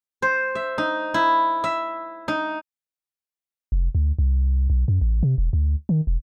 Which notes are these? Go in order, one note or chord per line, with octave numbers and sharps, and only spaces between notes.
C5
E5
D#4
E4
E5
D#4
F1
D2
C2
B1
F#2
A1
C3
E1
D2
D#3
E1